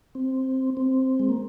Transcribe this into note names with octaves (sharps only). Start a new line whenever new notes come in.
C4
C4
G#3
A#3